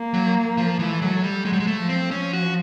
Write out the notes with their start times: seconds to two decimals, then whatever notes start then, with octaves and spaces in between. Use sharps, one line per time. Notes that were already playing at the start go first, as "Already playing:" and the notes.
Already playing: A#3
0.14 F#3
0.57 F3
0.79 E3 A3
1.02 F#3
1.23 G3
1.45 F#3 G#3
1.53 G3
1.60 G#3
1.67 A3
1.79 F3
1.89 C4
2.11 F3 C#4
2.33 F#4